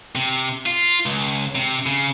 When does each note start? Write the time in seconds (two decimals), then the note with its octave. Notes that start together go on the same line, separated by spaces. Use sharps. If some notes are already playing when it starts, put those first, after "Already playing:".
0.15 C3
0.66 F4
1.06 C#2
1.55 C3
1.86 C#3